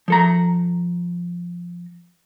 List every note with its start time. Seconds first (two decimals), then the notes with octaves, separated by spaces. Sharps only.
0.08 F3 A4 A#5